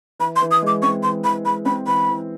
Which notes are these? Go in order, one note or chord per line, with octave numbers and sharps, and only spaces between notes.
E3 B5
C6
E3
D#6
G#3 D6
C4 C#6
E3 C6
E3 B5
G#3 B5
C4 B5
E3 B5
E3